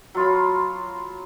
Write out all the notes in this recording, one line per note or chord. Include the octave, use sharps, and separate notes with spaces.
F#3 F4 B5